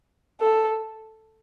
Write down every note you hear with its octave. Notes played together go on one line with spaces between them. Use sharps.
A4